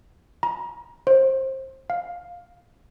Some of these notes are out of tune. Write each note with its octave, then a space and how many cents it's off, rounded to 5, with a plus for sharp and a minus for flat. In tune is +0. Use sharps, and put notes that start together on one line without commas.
A#5 +30
C5 +25
F5 +10